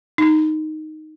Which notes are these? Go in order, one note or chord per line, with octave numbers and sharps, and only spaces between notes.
D#4